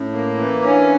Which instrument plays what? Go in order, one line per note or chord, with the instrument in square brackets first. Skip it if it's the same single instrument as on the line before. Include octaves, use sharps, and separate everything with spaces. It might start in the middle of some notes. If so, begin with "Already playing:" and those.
Already playing: [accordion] A2 [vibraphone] C#4
[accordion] A#3
E3
[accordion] C#4 [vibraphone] D4